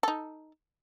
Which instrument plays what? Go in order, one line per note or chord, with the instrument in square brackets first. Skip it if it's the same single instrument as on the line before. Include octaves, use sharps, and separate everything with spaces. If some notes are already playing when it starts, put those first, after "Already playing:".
[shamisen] D#4 A4